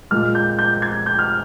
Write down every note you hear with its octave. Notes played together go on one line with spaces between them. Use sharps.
A#2 G#3 F6
G6
G6
G#6
G6
F6